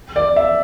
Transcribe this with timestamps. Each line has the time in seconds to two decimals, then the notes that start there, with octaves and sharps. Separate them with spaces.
0.16 D5
0.36 E5